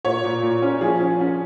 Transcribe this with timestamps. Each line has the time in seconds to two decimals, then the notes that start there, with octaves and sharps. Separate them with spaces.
0.05 A#2 C#5
0.24 A#2
0.42 A#2
0.62 C#4
0.81 F3 G#4
1.00 C#4
1.20 C#4